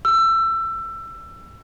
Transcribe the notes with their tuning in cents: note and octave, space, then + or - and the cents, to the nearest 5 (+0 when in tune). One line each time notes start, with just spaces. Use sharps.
E6 +25